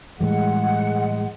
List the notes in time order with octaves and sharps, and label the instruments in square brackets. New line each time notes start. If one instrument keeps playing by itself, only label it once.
[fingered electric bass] A2 E3 G3 [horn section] G#3 [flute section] F#5